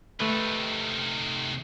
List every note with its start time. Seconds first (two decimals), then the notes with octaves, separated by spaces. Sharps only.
0.20 C3 D#3 A3 B4